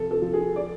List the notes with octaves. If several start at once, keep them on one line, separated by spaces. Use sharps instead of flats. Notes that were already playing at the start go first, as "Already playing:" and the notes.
Already playing: C3 F3 A4
A4
F3
G#4
D5